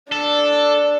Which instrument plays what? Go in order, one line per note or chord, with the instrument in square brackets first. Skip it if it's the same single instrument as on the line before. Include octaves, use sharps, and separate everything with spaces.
[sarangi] D4 [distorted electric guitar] A4